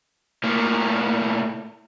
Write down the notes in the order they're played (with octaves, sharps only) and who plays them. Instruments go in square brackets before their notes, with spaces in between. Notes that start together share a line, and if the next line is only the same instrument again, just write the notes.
[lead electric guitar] A2 A#3